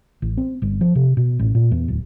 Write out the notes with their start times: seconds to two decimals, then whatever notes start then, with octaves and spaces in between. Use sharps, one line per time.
0.22 A1
0.37 C4
0.62 G1
0.81 F3
0.95 C3
1.17 B2
1.39 A1
1.55 A#2
1.71 E2
1.88 D1